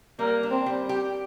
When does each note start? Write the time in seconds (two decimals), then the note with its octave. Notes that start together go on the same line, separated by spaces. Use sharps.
0.19 G3 A#3
0.43 D4
0.50 C4
0.66 G3
0.89 G4